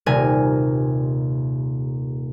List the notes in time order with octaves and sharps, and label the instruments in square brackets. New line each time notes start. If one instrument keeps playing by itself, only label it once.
[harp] D#1 C3 A#4 G#5